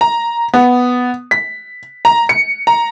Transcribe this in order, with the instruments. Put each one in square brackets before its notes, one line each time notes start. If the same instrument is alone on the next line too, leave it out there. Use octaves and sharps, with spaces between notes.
[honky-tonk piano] A#5
B3
B6
A#5
C#7
A#5